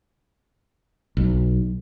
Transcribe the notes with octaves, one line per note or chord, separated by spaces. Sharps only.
B1